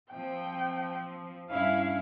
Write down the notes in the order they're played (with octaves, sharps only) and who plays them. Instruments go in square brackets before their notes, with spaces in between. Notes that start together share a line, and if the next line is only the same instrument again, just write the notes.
[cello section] F3 C4 [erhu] G5
[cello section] G2 C#4 E4 [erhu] F5